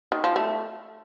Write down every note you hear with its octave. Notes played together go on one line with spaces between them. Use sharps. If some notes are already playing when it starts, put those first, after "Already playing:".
D#3
F3
A3